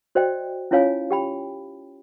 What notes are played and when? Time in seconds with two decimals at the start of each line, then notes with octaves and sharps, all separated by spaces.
0.15 F#4 C5 D5 D#5 G5
0.71 C#4 E4 F4 C#5 F5 G#5
1.11 G4 G5 B5